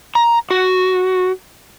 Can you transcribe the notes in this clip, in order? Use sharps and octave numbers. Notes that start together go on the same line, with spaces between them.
A#5
F#4